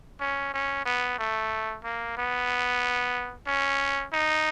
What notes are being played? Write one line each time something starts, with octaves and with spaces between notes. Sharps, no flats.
C#4
C#4
B3
A3
A#3
B3
C#4
D#4